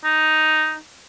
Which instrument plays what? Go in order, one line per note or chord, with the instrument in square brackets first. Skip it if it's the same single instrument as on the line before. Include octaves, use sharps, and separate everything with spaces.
[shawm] D#4